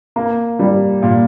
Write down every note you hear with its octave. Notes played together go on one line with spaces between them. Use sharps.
A#3
G3
A#2